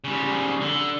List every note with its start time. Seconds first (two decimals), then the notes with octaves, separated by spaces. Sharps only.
0.04 C#3 G3
0.61 D3